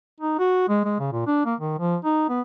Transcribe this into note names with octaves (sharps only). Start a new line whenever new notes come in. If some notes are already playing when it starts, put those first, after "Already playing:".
D#4
F#4
G#3
G#3
C#3
A#2
D4
A#3
D#3
F3
D#4
B3